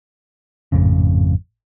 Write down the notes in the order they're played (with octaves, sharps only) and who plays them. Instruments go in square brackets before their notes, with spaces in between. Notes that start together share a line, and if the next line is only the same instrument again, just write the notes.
[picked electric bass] G#1 F2 A2 C#3